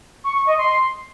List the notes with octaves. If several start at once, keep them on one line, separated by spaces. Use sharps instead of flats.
C#6
C#6
D#5
C6